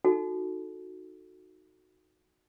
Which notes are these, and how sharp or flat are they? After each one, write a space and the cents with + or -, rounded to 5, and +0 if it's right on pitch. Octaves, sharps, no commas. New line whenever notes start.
D#4 +0 F#4 -15 A4 +0